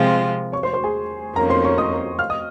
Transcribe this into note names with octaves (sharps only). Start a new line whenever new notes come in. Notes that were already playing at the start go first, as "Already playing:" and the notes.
Already playing: C3 F3 G#3 C4 F4 A#4
C#5 C#6
C5 C6
C5 C6
G#4 G#5
F2 D#3 A#3 C#4 A#4 A#5
C5 C6
C#5 C#6
D#5 D#6
F5 F6
D#5 D#6